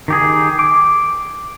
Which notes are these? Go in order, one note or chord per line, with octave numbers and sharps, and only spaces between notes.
D#3 G4 G#4
D6